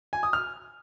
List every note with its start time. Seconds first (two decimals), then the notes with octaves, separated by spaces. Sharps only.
0.13 G#5
0.23 D#6
0.33 F6